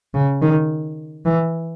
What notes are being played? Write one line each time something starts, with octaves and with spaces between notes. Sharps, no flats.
C#3
D#3
E3